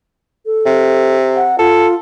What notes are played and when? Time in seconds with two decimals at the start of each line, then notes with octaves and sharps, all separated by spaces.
0.46 A4
0.66 C3
1.36 F#5
1.59 F4 A4